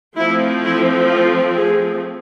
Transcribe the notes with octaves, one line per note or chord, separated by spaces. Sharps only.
F3 A3 C4 E4
E4
F4
G#4